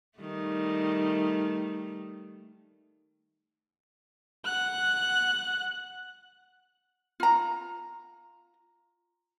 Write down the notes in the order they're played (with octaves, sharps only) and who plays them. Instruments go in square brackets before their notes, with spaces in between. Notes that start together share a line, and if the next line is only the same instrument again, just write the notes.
[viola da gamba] D#3 G3 A3
[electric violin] F#5 F#6
[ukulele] F4 A#5